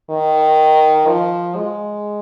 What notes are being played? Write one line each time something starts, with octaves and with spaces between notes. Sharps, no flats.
D#3
F3
G#3